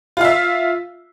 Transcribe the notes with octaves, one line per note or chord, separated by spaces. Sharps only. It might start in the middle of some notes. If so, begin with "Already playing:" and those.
F4 E5 F5